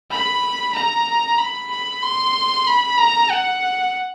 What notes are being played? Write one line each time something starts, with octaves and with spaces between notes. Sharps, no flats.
B5
A#5
B5
B5
C6
B5
A#5
F#5